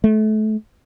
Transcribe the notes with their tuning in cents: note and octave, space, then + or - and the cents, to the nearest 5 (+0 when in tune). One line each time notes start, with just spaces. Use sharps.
A3 -30